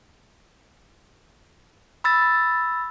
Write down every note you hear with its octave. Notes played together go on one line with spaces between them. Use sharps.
B5 E6 A6